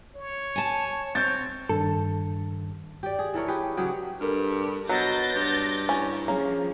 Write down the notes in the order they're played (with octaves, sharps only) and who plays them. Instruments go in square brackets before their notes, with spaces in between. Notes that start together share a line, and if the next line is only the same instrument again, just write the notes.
[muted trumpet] C#5
[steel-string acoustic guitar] G#5 A5
[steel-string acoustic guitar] C4 [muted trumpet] C#5 [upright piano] G6 A6
[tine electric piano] G2 D#3 [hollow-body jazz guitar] A4
[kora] G4 D5
G#4
E3 A4 A#4 C#5
G4 G#4 B4
C#3 F#3 G4 G#4
[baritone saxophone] G2 [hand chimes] A4 A#4 F6
[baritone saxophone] B2 [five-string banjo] F#3 [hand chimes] F#6 [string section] G6 A6 A#6
[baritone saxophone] G2
[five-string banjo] C#4 [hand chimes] E4
[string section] F3 [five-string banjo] A#3 [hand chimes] C#4 G#4 C#5